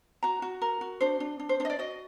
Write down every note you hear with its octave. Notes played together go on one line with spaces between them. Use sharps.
F#4 A#5
F#4
A#4
F#4
D4 C5
D4
D4
C5
D4 C5
D#5
D5
F#4 D#5